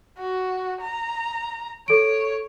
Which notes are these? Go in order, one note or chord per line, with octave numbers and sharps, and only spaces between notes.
F#4
A#5
A4 C#5 D7